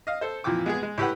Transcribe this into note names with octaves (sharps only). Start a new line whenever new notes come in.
D#5 F5
A4 C5
F2 A#2 E3 G5 D6
G#3 B3 G#4
G#3
A2 G4 B4 F#5